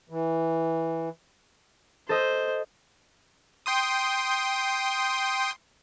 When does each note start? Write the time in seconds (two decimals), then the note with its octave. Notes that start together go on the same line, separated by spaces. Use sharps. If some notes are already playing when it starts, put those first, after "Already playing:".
0.10 E3
2.09 A4 C5 D#5
3.66 G5 C6 D#6